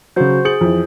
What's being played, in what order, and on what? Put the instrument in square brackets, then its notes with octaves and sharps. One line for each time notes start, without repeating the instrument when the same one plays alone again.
[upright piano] C#3 F#3 [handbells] F#4 C5 G6
[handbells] G#4 [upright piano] G6 C#7 F#7
[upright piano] F2 E3